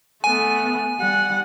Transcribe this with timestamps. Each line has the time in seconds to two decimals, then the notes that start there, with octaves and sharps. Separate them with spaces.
0.24 A3 B3 G#5
1.00 G3 F#5